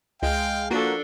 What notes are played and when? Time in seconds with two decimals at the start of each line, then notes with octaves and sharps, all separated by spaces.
0.22 C#2 G#3 F5 G5
0.71 F3 A#3 D4 F#4 A4